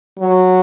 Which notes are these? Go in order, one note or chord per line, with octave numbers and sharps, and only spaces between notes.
F#3